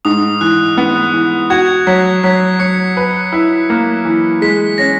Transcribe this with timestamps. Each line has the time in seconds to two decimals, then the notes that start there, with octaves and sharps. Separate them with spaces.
0.05 G#2 D#6
0.41 E3 F#6
0.78 B3
1.14 E3
1.50 F#4 G#6
1.87 F#3 B6
2.24 F#3 B6
2.60 F#3 C#7
2.97 B4
3.32 E4
3.70 A#3
4.05 E3
4.42 G#3 B6
4.78 C#4 A#6